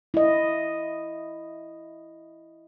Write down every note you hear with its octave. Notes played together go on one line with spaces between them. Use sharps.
E4 D#5